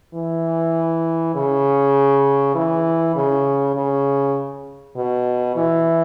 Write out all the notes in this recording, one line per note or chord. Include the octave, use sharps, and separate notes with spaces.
E3
C#3
E3
C#3
C#3
B2
E3